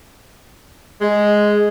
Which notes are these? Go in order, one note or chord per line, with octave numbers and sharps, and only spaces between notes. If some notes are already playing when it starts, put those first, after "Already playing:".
G#3